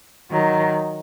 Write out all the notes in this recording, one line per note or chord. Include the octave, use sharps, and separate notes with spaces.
D#3 F#3